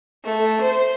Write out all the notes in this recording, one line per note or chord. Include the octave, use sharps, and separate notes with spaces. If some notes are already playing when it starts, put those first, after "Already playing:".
A3
C5